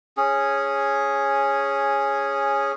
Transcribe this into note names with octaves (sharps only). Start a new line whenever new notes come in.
C#4 G#4